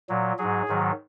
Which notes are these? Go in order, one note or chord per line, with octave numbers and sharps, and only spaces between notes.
A#2 F#3
G#2 F#3 G#4
G#2 D#3 F#3